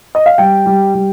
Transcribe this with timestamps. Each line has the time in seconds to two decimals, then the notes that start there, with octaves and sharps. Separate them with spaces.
0.15 D#5
0.26 F5
0.38 G3 G5
0.66 G3
0.94 G3